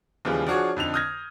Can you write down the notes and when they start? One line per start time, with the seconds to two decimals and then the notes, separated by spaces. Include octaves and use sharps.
0.25 D#2 C#3 E3 F3 G3 G#3
0.47 F3 D4 F#4 G#4 C#5
0.77 F2 D3 D#4 F7
0.94 D#6 F6 G6 G#6 A#6